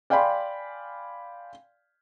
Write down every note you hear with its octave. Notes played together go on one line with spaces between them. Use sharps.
D5 F5 G5 G#5 B5 C6